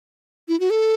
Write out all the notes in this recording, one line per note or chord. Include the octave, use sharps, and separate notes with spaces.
E4
F#4
A4